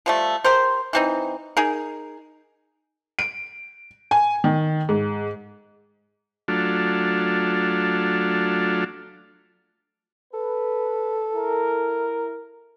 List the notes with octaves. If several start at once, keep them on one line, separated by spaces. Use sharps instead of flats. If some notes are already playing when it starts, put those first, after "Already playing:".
F3 G3 A3
G4 A#4 C5
E3 C4 D#4
D#4 G#4 A#4
D7
G#5
D#3
G#2
F#3 A3 D4 F4
A4 B4
E4 A#4